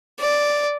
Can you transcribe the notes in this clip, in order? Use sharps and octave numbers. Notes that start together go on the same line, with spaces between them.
D5